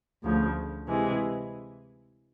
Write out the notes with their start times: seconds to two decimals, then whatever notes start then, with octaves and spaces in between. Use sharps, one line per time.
0.23 D2 C#3 F3
0.88 C3 E3 G#3